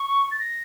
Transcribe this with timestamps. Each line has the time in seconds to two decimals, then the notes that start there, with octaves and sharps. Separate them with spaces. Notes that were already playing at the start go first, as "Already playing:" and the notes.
Already playing: C#6
0.31 A6
0.39 A#6